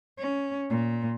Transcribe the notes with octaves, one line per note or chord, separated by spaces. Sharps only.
C#4
A#2